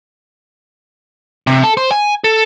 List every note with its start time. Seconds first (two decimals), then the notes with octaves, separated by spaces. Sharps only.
1.47 C3
1.64 A4
1.77 C5
1.92 G#5
2.24 A4